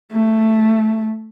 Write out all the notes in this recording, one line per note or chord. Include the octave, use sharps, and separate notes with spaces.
A3